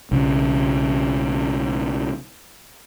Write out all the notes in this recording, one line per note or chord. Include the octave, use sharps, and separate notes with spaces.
B1 C#3